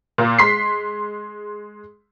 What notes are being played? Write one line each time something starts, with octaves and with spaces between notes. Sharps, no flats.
A#2 A#3
G#3 C6 B6 C7